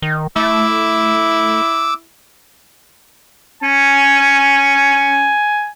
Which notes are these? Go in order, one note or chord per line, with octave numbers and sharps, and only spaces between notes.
D#3
A3 E4 D6 E6
C#4 G#5